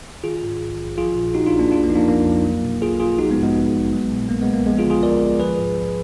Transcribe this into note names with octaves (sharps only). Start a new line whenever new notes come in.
D#3 F4 G#4
G#2
A#1
A#1
F3 F4 G#4
A#2
B1 D#4 F#4
D4 F4
B1
A#3 D4
F2 D4 F4
A#3
F3 D#4
A#3 D4
F2 A#3
F3
F#3
B2
B1 F4 G#4
B1 F4 G#4
F3 D#4 F#4
G#3 B3
G#2
G#3 B3
A#1
A#1
F#3
A#2
B1 A#3
G#3 B3
B1
A#3
F3 G#3 B3
F4 G#4
D3
F4 G#4
D2 A#4 D5
D2
F3 G#4 B4
G#2
A#1